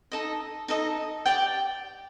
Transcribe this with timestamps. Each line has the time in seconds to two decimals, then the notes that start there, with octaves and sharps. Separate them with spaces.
0.12 D#4 A4 D#5
0.68 D#4 A4 D#5
1.26 G4 D5 G5